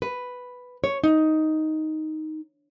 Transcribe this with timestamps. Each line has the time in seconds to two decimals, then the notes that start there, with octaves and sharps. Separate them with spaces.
0.02 B4
0.84 C#5
1.04 D#4